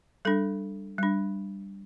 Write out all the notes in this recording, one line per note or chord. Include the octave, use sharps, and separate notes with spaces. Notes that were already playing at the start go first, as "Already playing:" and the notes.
G3 D4 A4
G3 D4